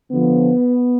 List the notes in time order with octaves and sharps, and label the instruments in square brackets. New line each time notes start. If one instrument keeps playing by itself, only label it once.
[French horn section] D3 F3 B3